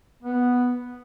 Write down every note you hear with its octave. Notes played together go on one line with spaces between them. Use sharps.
B3